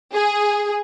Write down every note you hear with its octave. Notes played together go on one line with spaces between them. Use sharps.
G#4